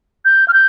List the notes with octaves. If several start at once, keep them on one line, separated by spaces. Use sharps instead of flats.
G6
F6
G6